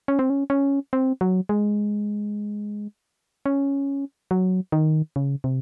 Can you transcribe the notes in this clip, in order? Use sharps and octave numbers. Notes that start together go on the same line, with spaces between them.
C#4
C4
C#4
C#4
C4
F#3
G#3
C#4
F#3
D#3
C#3
C3